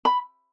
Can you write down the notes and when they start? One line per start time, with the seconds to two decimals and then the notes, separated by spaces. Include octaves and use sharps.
0.05 B5